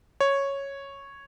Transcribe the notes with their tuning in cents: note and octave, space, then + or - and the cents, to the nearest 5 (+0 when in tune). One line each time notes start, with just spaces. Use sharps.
C#5 -5